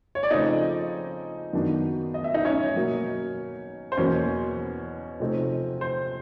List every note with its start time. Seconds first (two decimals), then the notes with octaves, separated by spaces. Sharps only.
0.15 C#5
0.23 D5
0.31 C#3 F3 A3 C4 D#4 D#5
1.53 F#2 D#3 F#3 B3 D4
2.14 D#5
2.24 E5
2.34 D#4 D#5
2.45 C#4 C#5
2.76 B2 F#3 A#3
3.92 C5
3.97 E2 B2 F#3 A#3 C#4 C#5
5.20 C3 F3 A3 C4 D#4
5.81 C5